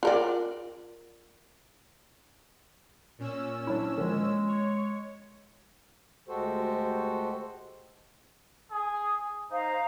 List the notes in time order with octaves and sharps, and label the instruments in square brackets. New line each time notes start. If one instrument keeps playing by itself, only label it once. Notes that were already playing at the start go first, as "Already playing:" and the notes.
[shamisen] F4 A#4 D5
[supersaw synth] A#2 C#4 E6
[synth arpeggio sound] F#3 E4 [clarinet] D4
[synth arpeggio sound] D#3 F3 [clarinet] G#3
[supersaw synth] C#5
[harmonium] D2 G#3 F#4 G4 A4 C5
[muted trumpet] G#4
[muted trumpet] D#4 [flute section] C5 F5 A#5